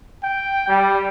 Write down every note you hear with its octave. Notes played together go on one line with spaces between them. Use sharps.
G5
G3